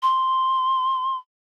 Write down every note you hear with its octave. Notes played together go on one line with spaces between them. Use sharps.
C6